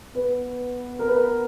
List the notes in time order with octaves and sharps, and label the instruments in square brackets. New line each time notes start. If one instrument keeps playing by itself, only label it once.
[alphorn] B3 [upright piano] B4
[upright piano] A#4
B4
A#4